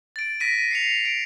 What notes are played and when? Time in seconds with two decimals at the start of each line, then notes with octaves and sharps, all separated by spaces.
0.16 A6 D7
0.40 A#6 B6 D7 D#7
0.71 C7 C#7 F7
1.05 D7